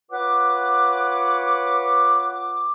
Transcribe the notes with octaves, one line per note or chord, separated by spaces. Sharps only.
F4 B4 C#5 F#5 D6